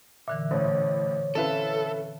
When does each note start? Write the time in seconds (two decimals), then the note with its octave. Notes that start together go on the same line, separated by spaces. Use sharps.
0.28 A#2 D3 E3 E5
0.51 A1 A2 C5 C#5
1.35 C4 C#4 E4 A4 B4 F5